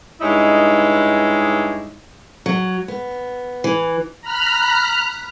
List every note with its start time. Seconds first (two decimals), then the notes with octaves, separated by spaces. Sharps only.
0.21 G2 G#3 D#4 E4 C#5 D#5
2.46 F#3
2.88 B3
3.64 E3
4.21 A#5 B5 F6 F#6